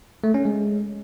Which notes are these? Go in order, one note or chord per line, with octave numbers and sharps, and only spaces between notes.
A3
C#4
G#3